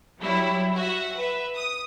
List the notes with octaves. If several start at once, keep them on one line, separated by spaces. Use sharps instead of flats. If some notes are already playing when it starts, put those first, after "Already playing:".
F#3 G3 E4 C#5
F#4 E5 F#5
B4 E5
D#6